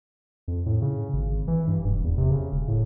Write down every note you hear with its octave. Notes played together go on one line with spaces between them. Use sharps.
F2
A2
C#3
G#1
E3
G2
E1
E2
C3
C#3
E1
A2